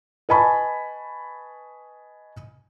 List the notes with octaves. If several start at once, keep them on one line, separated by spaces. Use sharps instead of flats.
B4 D#5 G#5 A5 B5 C#6